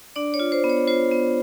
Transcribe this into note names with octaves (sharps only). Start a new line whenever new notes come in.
D4 D5
C#5
F4
C5
B3
C#5
F4 C5
B3